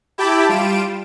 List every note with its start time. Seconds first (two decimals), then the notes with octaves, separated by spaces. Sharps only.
0.18 E4 G4 G5 A5 B5 D6
0.49 G3 F4 D7 E7